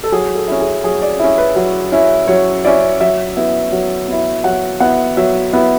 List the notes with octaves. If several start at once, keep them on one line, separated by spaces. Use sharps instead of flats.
A4
F#3 G#4
A4
C#4 E4
G#4
F#3 G#4
D5
C#4 E4
B4
F#3
C#4 E4
F#3 C#5
C#4 E4 D5
F#3 E5
B3 E4
F#3
B3 E4
F#3 F#5
B3 E4 F#5
F#3 E5
B3 E4